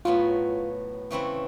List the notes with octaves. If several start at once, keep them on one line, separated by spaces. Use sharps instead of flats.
A2 F#3 B3 F4
C#3 E3 A3 C4 E4